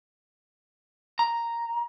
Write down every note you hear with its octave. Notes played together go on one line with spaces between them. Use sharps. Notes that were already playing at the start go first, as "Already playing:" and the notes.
A#5